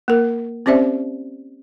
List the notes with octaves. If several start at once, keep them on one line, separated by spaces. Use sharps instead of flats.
A#3 A#4
C4 C#4 G4 C5 D5 E5